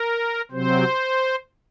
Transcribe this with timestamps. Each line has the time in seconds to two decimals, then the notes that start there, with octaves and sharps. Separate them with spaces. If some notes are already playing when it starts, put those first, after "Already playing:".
Already playing: A#4
0.51 C3 F#3 C4 C5